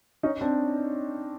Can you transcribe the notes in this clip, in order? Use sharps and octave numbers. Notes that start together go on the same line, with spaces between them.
C#4 D#4
C4 D4